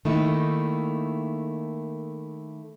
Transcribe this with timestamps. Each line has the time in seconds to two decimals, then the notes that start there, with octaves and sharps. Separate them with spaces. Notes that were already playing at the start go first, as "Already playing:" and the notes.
0.05 D#3 A3 A#3 D#4 E4